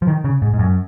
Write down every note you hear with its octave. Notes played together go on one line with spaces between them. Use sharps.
F3
D#3
C#3
G#2
G#2
F#2